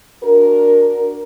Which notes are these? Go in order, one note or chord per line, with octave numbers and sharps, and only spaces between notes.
D4 F#4 A#4